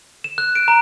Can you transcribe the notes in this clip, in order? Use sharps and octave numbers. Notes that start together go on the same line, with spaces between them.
E7
F#6
D7
A#5